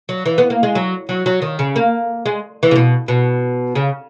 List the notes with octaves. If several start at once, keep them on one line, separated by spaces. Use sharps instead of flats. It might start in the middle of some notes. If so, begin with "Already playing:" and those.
F#3
E3
B3
A#3
G#3
F#3
F#3
F#3
D#3
C#3
A#3
G#3
E3
C#3
B2
B2
C#3